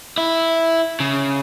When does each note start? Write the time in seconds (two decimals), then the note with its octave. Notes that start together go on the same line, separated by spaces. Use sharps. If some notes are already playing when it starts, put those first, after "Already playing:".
0.18 E4
1.00 C#3